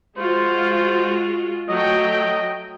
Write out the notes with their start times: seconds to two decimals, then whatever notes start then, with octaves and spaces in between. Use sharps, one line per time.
0.18 G#3 F4 F#4 C5
1.69 F#3 A3 D#5 G5